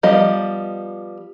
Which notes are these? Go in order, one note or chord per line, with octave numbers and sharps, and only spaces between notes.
F3 G3 B3 D#5